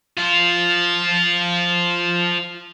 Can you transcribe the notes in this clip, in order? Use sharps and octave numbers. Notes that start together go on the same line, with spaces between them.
F3 F4